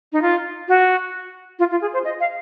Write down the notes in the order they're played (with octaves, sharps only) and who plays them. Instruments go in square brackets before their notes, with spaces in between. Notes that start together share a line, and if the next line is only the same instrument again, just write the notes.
[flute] D#4
F4
F#4
F4
F4
G#4
C5
D#5
F5